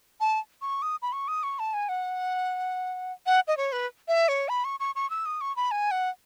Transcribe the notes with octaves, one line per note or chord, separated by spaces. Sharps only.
A5
C#6
D#6
B5
C#6
D#6
C#6
A5
G#5
F#5
F#5
D#5
C#5
B4
E5
C#5
B5
C#6
C#6
C#6
E6
D#6
C#6
B5
G#5
F#5